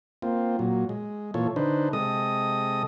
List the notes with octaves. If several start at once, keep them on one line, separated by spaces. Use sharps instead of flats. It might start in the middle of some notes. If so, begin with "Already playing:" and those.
A#3 C4 F4
A#2 F#3
G#3
A#2 E3 F4 A4 C#5
D3 D4 D#4 B4 C5
C3 G#3 A4 D#5 D#6